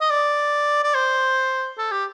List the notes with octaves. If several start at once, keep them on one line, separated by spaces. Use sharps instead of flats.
D#5
D5
D5
C5
A4
G4